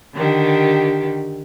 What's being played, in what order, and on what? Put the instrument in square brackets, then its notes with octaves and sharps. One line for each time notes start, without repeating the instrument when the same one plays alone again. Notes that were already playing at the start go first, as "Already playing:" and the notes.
[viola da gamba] D3 D#3 G4